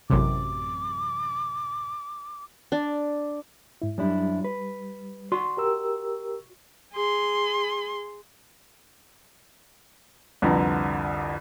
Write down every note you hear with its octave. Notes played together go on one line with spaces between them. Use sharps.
A1 F#2 C3 D6
D4
G#2 E4
F#2 G3 D4 E4
B4
F#4 D5 C6
G4 A#4 E6
G#4 C6
C2 F2 D3 B4 A#5